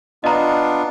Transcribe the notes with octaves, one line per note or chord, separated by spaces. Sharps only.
B3 D4 F4 D#5 A#5